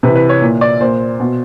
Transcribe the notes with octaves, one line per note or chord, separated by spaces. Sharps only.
C3 E3 B4
B4
C#5
A#2
D5
A#2 C5
B2